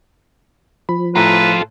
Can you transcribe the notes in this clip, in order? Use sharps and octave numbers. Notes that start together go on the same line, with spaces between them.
F3 B5
A2 F4 A4 B4 A#5